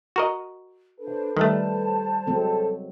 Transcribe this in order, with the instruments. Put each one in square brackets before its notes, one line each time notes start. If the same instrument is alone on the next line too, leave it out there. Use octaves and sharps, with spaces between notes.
[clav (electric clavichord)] F#4 A#4 D#5
[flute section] D4 C5 [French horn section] A4 B4
[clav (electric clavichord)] D#3 A3 [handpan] G3 [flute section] C5 A5
[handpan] F#3 G#3 C4 [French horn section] A4